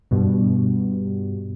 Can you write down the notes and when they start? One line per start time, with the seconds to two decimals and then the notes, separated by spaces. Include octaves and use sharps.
0.11 G2 B2